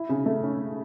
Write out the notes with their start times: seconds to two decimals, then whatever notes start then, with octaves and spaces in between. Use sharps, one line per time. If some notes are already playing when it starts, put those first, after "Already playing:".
Already playing: E4
0.09 C#3
0.26 A3
0.44 C#4